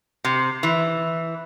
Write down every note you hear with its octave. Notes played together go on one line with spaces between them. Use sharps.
C3
E3